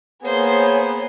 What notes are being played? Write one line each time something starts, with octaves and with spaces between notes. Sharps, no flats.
A#3 B3 G#4 C5 C#5